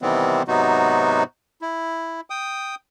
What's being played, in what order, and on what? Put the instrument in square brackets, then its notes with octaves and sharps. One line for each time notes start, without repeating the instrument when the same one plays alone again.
[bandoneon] C3 D#3 E3 G3 B3 C4
G#2 C3 F#3 B3 D#4 F#4
E4
G5 D#6